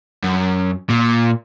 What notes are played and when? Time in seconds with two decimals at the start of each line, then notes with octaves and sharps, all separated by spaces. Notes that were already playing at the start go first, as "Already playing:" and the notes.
0.23 F#2
0.90 A#2